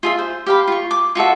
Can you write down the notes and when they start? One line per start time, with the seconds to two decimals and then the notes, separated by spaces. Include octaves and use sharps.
0.03 F4 G#4 E5
0.19 C5
0.46 G4 F5 B5
0.68 F4 C#6
0.91 D6
1.15 F4 F#4 A4 E5